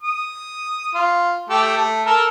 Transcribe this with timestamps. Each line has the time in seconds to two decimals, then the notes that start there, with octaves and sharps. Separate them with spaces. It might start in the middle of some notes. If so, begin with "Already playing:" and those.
0.03 D#6
0.95 F4
1.50 A3 G4 A4
1.77 A3
2.06 A4 A#4